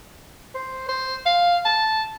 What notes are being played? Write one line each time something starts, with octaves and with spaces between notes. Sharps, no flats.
C5
C5
F5
A5